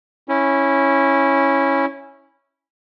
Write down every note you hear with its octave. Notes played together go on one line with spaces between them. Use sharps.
C#4 E4